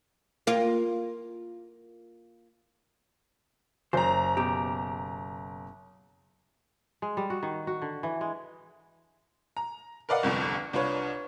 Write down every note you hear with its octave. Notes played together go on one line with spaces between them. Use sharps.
A#3 F4
F#1 C5 A#5
B2 G4
G#3
G3
F#4
D#3
F#4
D3
E3
G#3
A#5
A#4 B4 D5 D#5 F5 F#5
G1 C2 F2 D3
C2 D4 F4 B4 C#5